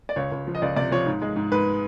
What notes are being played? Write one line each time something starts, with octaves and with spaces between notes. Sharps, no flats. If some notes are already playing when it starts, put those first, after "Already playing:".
D5
C#2 C#5
C#2
F3
D#5
C#2 D5
C3 D5
F3 C#5
G#2
G#3
G#2
G#2 B4